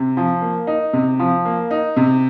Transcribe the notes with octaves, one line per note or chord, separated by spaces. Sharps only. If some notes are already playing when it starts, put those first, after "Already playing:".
Already playing: C3
F3
A#3
D#4
C3
F3
A#3
D#4
C3